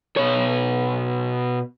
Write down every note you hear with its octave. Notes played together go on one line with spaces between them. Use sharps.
B2 C#5